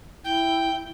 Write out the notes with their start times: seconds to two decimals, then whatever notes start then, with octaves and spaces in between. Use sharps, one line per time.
0.24 E4 G5